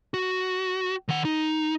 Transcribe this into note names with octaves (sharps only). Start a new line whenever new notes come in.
F#4
D#3 F#5
D#4